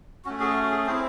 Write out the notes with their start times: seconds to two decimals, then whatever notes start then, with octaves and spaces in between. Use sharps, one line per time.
0.25 A3 C#4 F#4
0.40 G#4
0.55 F#4
0.71 G#4
0.86 C4 G#4 C5
0.89 E4